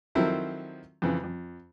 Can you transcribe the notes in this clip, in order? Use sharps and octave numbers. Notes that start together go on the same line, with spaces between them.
D#3 F3 F#3 C4 E4 A4
F2 C#3 E3
F2